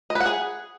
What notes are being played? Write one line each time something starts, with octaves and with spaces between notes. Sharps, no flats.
D#5
B4
F#5
G#4